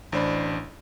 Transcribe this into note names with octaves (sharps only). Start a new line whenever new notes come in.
A1 D4 C5 D5 B5